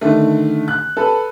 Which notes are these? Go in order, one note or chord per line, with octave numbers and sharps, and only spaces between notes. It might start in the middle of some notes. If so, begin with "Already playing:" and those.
D3 D#3 A3
F#6
A4 B4